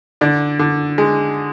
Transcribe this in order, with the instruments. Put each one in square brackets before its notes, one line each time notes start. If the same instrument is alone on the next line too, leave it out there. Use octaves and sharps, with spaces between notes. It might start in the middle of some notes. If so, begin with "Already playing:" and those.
[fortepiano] D3 D5
D3
G#3